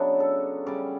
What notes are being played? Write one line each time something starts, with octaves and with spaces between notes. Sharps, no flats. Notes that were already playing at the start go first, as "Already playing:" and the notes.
Already playing: C#3 F#3 B3 D4 C#5 E5
A4
C#3 G3 C#4 D5